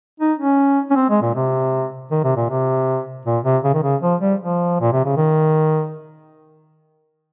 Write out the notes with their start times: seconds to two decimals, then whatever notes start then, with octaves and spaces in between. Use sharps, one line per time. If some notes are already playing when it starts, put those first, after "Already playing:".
0.20 D#4
0.40 C#4
0.91 C#4
0.96 C4
1.10 G#3
1.22 A#2
1.35 C3
2.11 D#3
2.24 C3
2.36 A#2
2.50 C3
3.26 A#2
3.45 C3
3.64 C#3
3.74 D#3
3.83 C#3
4.02 F3
4.21 G3
4.40 F3
4.81 A#2
4.93 C3
5.05 C#3
5.17 D#3